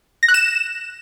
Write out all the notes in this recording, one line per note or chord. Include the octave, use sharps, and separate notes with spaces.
A#6
F#6
E7